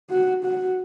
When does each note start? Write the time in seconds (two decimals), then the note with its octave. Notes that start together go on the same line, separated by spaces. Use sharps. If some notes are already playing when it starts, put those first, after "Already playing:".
0.10 F#4
0.44 F#4